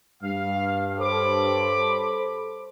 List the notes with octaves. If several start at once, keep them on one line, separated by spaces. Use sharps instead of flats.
G2 F5
A4 C5 C#5 B5 D6